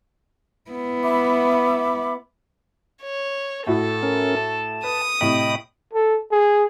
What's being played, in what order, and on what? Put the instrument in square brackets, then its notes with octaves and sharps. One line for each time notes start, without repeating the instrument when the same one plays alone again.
[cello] B3 E4
[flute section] E5 B5 D6
[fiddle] C#5
[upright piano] A2 E4 F#4 [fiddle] A4
[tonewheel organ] C#4 A#4
A5
[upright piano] B4 [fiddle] D#6
[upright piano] A2 C3 [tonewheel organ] D#5 G5 B5
[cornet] A4
G#4